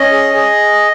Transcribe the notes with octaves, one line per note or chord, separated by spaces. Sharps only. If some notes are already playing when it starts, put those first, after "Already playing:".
Already playing: C#4 D#5
G#4
G#4